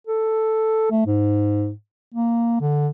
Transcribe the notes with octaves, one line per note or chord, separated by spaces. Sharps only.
A4
A3
G#2
A#3
D3